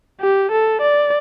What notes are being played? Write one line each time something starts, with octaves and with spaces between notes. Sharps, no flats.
G4
A4
D5